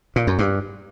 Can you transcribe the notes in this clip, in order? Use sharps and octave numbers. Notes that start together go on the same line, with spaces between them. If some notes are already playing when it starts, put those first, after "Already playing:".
A#2
F#2
G2